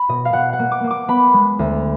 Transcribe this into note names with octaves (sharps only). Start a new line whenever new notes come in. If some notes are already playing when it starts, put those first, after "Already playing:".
Already playing: B5
B2 D#5
F5
B2 F#5
F#5
A#3
D6
A#3
D6
B3 B5
G#3
D2